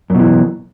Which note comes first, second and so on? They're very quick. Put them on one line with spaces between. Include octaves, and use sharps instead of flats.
F#2 B2 E3